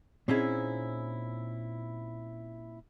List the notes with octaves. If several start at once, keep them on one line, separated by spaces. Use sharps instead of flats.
A#2 C4 C#4 D#4 E4 G#4